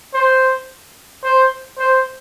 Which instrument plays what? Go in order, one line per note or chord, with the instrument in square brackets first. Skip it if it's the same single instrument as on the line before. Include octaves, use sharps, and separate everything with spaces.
[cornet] C5
C5
C5